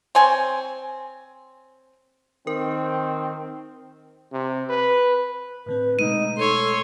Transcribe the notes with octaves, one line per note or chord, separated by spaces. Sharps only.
C4 C#5 G#5
D#3 C4 A#4
C3
B4
A2 D3 C4 B4
B2 G#3 A3 D#4 D#7
A4 C#5 C6